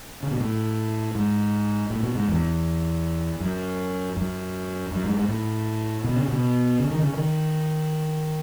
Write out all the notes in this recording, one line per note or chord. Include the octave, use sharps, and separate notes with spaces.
C#3
B2
A2
G#2
A2
B2
G#2
E2
F#2
F#2
F#2
G#2
G#2
A2
B2
C#3
B2
C#3
D#3
C#3
D#3